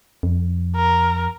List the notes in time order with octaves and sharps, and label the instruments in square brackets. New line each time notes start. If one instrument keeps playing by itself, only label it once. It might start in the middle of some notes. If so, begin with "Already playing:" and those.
[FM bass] F2
[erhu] A#4